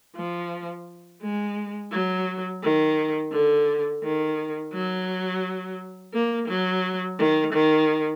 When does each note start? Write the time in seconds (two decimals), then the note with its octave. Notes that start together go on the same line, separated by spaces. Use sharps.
0.16 F3
1.22 G#3
1.92 F#3
2.63 D#3
3.32 D3
4.03 D#3
4.73 F#3
6.14 A#3
6.48 F#3
7.19 D#3
7.53 D#3